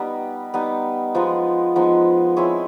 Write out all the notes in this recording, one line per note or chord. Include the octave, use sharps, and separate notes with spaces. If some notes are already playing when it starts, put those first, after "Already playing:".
Already playing: G3 B3 D#4
G3 B3 D#4
F3 G#3 B3 D#4
F3 G#3 B3 D#4
C4 E4 G#4 C#5